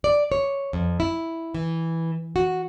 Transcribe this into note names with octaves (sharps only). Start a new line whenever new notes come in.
D5
C#5
F2
E4
E3
F#4